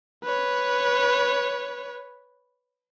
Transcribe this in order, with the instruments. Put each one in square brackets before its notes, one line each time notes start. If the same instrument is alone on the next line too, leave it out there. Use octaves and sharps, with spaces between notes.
[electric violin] B4 C#5